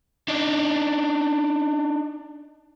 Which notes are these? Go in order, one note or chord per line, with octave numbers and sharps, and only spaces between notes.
D4 D#4